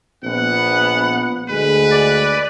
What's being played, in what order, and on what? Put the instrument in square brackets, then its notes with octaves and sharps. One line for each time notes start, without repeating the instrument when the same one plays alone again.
[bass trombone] A#1 [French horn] B3 [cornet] F#5
[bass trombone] D2 [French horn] G#3 [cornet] B4
[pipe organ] D5